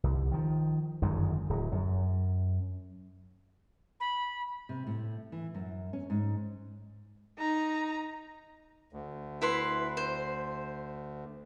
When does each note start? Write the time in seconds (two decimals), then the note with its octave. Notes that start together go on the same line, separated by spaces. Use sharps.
0.03 C2
0.32 D#3 F3
1.02 G1 F#2 D#3 G#3
1.49 D1 F#3
1.72 F#2
4.00 B5
4.69 C3
4.87 A2
5.32 E3
5.54 F#2
5.93 C#4
6.10 G#2
7.39 D#4 A#5
8.93 D2
9.42 E4 B4 C6
9.97 C5